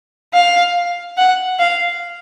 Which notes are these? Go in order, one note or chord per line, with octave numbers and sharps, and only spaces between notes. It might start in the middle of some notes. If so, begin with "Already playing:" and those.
F5
F#5
F5